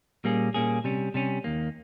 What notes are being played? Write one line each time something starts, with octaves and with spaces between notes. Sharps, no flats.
A#2 G3 A#3 C#4 G#4
A#2 G3 A#3 C#4 G#4
C3 G3 C#4
C3 G3 C#4
D#2 D#3 A#3